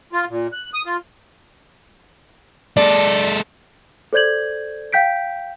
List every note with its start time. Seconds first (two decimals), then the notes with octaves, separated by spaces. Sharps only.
0.13 F4
0.29 A#2
0.53 F#6
0.74 D#6
0.86 F4
2.77 G#3 A4 D5
4.13 A4 C5 D5 G6 G#6 F#7
4.93 F5 G5 G6 B6 D7